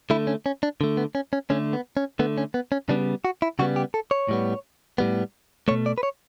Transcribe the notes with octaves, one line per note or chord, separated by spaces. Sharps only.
D3 A3 E4
C#4
C#4
D4
D3 A3
B3
C#4
C#4
D3 A3 C#4
B3
C#4
D3 A3 B3
C#4
B3
C#4
C#3 G3 B3 D4
F#4
E4
C#3 G3 B3 F#4
G4
A4
C#5
A2 G3 B3
A2 G3 B3
B2 A3 C#5
D5
B4
C#5